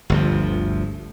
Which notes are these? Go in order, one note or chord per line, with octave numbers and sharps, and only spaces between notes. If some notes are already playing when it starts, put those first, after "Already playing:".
G1 D2 F3